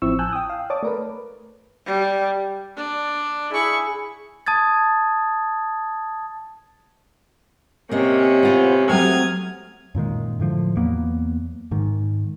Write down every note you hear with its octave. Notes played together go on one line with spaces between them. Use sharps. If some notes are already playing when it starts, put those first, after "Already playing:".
A1 F3 C4 E4 C#6 E6
G#5 A5 E6 F#6 G6
G5 D#6
F5
C#5 D5 A5 D6 D#6
A3 A#4 B4
G3
D4
E4 G#4 C#6
A5 D#6 G#6 A6
C3 A#3 C#4 D#5
B3 F4 C5
F#3 A3 C4 D#6 F6 G#6
F#2 A#2 D#3 G#3
A2 D3 F3
E2 F#3 A#3 B3
G#2 D#3